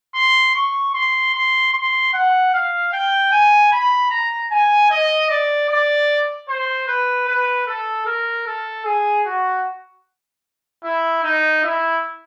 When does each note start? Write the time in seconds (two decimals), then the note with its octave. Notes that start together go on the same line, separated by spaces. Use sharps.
0.15 C6
0.55 C#6
0.94 C6
1.33 C6
1.73 C6
2.13 F#5
2.53 F5
2.93 G5
3.32 G#5
3.72 B5
4.10 A#5
4.51 G#5
4.90 D#5
5.30 D5
5.69 D5
6.49 C5
6.87 B4
7.28 B4
7.67 A4
8.06 A#4
8.47 A4
8.85 G#4
9.26 F#4
10.84 E4
11.23 D#4
11.64 E4